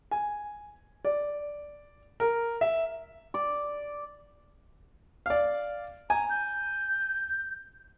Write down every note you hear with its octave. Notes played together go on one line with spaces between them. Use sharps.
G#5
D5
A#4
E5
D5
D5 F5
G#5 A#5
G6